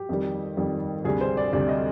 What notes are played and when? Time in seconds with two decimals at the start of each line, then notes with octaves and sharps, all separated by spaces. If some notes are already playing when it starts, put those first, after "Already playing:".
Already playing: G4
0.09 F2 D#3 G3
0.57 F2 D#3 G3
1.05 D2 C3 G3 G#4
1.21 C5
1.37 D5
1.53 D2 C3 G3 D5
1.69 D#5